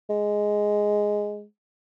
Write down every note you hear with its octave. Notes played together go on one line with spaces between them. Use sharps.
G#3